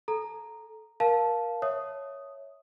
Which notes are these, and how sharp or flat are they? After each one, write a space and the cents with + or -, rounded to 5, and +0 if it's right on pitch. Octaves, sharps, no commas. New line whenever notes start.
A4 -20 A#5 +0
A#4 +20 F5 +5 A5 -10
C#5 +0 E5 -15 D#6 +0